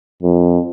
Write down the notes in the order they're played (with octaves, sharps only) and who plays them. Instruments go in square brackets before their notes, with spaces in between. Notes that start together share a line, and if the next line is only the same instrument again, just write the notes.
[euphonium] F2